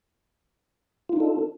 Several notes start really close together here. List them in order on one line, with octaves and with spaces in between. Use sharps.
F4 D#4 D4 A4